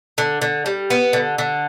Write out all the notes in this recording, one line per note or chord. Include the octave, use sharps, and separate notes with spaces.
D3
D3
G3
B3
D3
D3